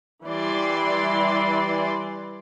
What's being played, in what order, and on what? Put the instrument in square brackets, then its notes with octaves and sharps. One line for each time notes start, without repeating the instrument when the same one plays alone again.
[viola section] E3 G3 D5 C6